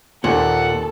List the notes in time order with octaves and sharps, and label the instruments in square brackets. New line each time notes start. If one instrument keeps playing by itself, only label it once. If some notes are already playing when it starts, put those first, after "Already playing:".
[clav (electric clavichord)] D#2 D#3 C4 [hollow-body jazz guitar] A#2 [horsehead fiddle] A4 [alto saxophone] F#5